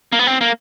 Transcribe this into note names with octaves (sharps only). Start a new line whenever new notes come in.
A#3
B3
C4
A#3